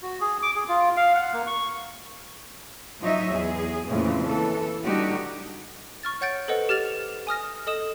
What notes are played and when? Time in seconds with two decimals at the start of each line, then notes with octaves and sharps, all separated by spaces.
0.02 F#4
0.21 G#4
0.42 D6
0.56 G#4
0.68 F4
0.96 F5
1.15 F#5
1.34 A#3
1.47 C#6
3.00 F3 F#3 D#4 C#5 D#5 E5
3.30 E2 G#4
3.87 F2 A#2 C#3 E3 F3 A3
4.27 E3 A4
4.84 D3 G3 D#4 F#4 G4
6.03 C#6 F6 A6
6.21 C#5 F#5 G6 A6 D7
6.48 A4 B4 C5 D#5 F#5
6.69 G4 F6 A6 F7
7.27 G#5 D#6 F6 A#6
7.67 A4 D#5 D#6 E7